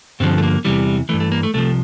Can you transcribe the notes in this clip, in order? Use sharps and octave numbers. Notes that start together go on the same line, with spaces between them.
G2 D3 F3 C4
A3
A#3
E2 C3 E3 G3
G2 E3 A3
A3
A#3
A3
C2 C3 F3 A3